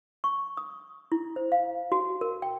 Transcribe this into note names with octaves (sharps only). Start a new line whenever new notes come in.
C#6
D#6
E4
C5
F5
F#4
A#4
G5